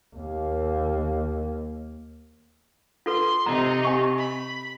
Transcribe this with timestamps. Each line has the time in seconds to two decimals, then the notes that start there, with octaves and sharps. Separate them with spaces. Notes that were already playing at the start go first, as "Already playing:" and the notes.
0.15 D#2 A#3
3.06 F4 A4 B4 C6
3.46 C3 D#4 A#5
3.85 G4 G#5 C#6
4.18 B5